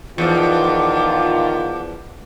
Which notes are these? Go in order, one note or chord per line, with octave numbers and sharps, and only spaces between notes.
E2 D#3 F3 F4 F#5 A5 D6